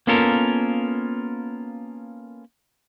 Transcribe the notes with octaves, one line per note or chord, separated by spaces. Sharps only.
A#3 B3 C#4 F4 A4 A#4